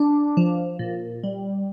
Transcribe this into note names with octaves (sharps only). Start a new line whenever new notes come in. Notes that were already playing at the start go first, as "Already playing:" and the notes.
Already playing: D4
F3
A#2
G3